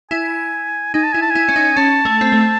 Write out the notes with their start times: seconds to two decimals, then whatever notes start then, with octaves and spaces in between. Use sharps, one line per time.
0.11 E4 G#5
0.94 D#4 G#5
1.03 A5
1.12 E4 G#5
1.22 A5
1.30 G#5
1.35 E4
1.49 C#4
1.56 D#4
1.77 C#4 A5
2.05 A3
2.21 C4
2.32 A3